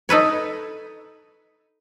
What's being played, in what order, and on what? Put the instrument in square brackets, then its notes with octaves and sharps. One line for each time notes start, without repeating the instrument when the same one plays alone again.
[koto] D#4 A4 B4 C#5